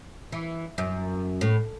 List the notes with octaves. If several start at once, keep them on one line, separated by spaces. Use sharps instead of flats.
E3
F#2
A2